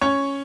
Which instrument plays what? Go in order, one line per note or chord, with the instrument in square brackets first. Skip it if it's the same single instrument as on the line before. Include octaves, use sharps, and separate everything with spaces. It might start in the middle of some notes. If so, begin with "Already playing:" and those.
[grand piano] C#4 C#5